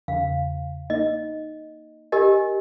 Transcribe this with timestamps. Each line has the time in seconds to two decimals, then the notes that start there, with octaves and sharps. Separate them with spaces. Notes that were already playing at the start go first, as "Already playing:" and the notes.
0.08 E2 C#3 F5
0.90 A#3 D#4 D#5
2.12 G4 A#4 D#5 G#5